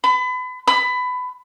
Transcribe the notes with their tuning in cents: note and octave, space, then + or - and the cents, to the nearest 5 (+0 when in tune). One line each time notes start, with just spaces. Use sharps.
B5 +30
B5 +20